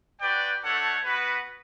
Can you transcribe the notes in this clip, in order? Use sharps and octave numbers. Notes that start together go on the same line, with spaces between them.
F#4 B4 D5 G5
A3 D4 A4 C#5 F#5
B3 F#4 B4